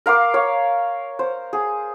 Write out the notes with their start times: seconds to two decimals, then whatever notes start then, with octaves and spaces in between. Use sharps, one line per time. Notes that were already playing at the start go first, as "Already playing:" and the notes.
0.06 A#4 F5 C6 D6
0.34 C#5 F5
1.19 C5
1.53 G#4